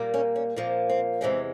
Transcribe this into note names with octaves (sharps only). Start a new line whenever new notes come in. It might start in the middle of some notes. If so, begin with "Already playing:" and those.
Already playing: A#2 G3 A#3
C#4
C#4
A#2 F3 A#3 C4
C4
E2 C3 E3 G#3 C4 C#4